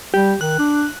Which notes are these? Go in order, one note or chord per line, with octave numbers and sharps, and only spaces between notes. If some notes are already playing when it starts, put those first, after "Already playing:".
G3 G4
D#3 F#6
D4